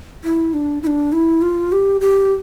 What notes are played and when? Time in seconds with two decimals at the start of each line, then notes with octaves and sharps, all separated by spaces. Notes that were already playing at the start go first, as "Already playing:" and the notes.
0.24 E4
0.54 D4
0.83 E4
0.87 D4
1.12 E4
1.42 F4
1.72 G4
2.01 G4